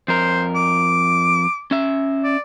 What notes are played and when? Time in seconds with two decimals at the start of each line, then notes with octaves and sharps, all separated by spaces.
0.08 F2 A#4 C5
0.55 D6
1.71 C#4 E5
2.24 D5